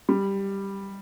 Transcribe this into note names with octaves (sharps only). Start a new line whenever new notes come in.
G3